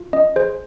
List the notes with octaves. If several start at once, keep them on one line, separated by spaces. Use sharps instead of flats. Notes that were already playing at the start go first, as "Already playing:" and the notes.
Already playing: F4
C#4 D#5
G#4 C5